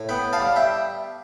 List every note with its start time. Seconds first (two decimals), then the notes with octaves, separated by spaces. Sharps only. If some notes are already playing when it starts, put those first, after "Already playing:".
Already playing: A2
0.09 B3 G5 B5
0.33 F5 A5
0.40 G3
0.56 E5 G5